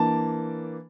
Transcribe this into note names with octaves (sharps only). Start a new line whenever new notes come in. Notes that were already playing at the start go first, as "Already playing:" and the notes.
Already playing: E3 A#3 D4 A5